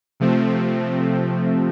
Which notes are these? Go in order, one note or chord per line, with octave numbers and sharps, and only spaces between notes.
C3 F3 A3 C4